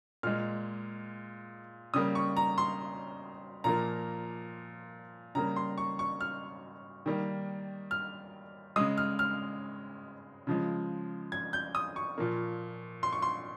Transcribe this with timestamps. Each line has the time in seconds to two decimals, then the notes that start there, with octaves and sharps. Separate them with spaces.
0.23 A#2 G#3 F6
1.94 C#3 G3 A#3 D#6
2.15 C#6
2.37 A#5
2.58 C6
3.64 A#2 F3 A#3 A#5
5.35 C#3 G3 A#3 A#5
5.56 C6
5.78 C#6
5.99 C#6
6.21 F6
7.06 D#3 G3 A#3
7.91 F6
8.76 C#3 G#3 D#6
8.98 F6
9.19 F6
10.47 C#3 F3 G#3
11.32 G#6
11.53 G6
11.75 D#6
11.96 C#6
12.18 A#2 F3 A#3
13.03 C6
13.13 C#6
13.22 C6